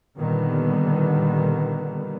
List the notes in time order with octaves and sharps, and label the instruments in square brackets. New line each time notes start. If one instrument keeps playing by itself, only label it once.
[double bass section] A#2 D3 D#3 G3 B3